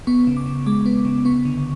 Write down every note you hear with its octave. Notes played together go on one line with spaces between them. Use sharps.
B3 C#6
C#3
D6
C#3
G#3 D6
B3
C#3
B3 C#6
D3